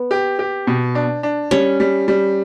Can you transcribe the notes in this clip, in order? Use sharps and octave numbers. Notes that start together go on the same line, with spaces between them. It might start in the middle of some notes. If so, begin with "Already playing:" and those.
Already playing: B3
G4
G4
B2
D4
D4
G3 C#4
G3
G3